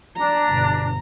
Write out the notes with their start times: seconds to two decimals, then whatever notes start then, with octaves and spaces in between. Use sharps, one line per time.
0.17 D4 A#5
0.49 G1 B2